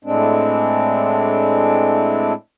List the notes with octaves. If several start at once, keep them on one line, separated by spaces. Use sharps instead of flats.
A2 G#3 C4 D4